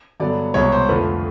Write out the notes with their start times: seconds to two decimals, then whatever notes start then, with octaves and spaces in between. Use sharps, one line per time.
0.20 G2 D3 F#3 B3 D5
0.54 C2 B2 G#3 C#5
0.72 C5
0.89 F2 D3 F3 A3 B4